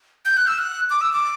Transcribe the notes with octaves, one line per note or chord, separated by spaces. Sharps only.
G6
F#6
E6
F#6
D6
E6
D6